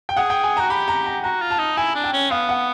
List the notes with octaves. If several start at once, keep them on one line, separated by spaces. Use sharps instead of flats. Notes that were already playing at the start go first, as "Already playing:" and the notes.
G5
G#4 F#5
G5
G#5
F#4 A#5
G4 B5
A#5
A#5
F#4 A#5
F4
A5
D#4
E4 G#5
D4
G5
C#4
B3 F5
F#5